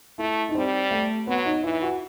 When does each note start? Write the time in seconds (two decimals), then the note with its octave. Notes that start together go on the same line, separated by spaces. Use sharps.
0.18 A3 E4
0.49 D#4
0.55 G3 C4
0.91 A3
1.27 F#3 B3
1.45 D#4
1.64 E3 E4
1.82 F#4